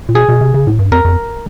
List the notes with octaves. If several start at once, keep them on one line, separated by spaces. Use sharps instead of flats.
A#2
B2 G#4
B2
C3
C#3
A2
G2
F2 A#4
F2